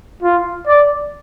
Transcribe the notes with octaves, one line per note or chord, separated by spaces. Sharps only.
F4
D5